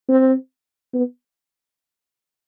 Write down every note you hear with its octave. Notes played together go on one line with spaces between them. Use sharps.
C4
B3